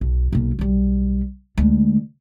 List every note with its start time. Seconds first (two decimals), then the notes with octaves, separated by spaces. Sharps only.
0.01 B1
0.32 B1 A#3
0.59 B1 G3
1.58 D2 G#3